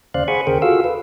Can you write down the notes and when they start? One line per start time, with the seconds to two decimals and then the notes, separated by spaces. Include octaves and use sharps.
0.14 D#2 C#3 C5 D5 F5 F#6
0.28 G#4 C5 F#5 G#5 B5 C#6
0.47 D#2 C#3 G#4 A#4 C5 G5
0.62 F4 F#4 G#4 A4 F5 E6
0.84 B4